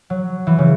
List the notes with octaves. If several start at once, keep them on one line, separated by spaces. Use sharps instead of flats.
F#3
E3
C#3